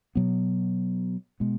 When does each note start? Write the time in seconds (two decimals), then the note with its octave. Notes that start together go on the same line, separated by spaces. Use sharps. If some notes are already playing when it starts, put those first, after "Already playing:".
0.15 B2 F#3 B3
1.40 B2 G#3 B3